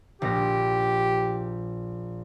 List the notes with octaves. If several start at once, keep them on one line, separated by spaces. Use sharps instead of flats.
A#1 A#2 G4 A#6